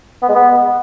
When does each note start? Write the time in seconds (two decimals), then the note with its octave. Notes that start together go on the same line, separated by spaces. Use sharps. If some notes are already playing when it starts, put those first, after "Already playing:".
0.23 B3
0.29 G#3
0.35 B3